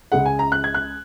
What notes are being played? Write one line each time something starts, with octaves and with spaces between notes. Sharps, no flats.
C#2 C#3 G#3 F#5
G#5
A#5
F#6
G#6
F#6